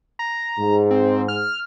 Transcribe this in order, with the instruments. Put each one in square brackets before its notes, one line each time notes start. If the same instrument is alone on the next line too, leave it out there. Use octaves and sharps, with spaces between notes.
[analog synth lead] A#5
[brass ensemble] G#2
[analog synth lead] C4
F6